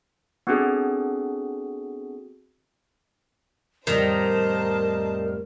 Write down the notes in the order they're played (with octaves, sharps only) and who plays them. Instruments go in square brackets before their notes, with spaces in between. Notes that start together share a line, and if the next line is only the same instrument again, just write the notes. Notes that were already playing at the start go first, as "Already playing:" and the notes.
[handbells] B3 C4 D4 F#4 G#4 A4
[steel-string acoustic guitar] F2 A2 G3 [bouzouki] D#3 [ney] A#4 [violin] C5 A5